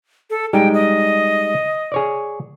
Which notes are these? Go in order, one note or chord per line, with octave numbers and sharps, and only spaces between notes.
A4
G3 G#3 D#4 G5
D#5
G#4 C#5 D5